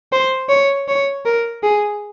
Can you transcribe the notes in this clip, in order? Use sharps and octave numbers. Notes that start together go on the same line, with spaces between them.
C5
C#5
C#5
A#4
G#4